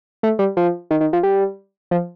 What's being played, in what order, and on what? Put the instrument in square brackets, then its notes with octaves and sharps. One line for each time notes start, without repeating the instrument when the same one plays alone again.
[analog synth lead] A3
G3
F3
D#3
D#3
F3
G3
F3